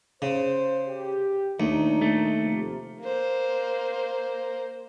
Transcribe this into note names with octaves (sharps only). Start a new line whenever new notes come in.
C#3 C5
G4
D#2 A#2 A3 D4 D#4
A3
C3 F3 A#3
A#3 C5